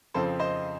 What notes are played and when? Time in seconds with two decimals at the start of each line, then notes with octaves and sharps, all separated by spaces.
0.14 F2 C#3 F3 C4 A4 C5
0.40 C5 D#5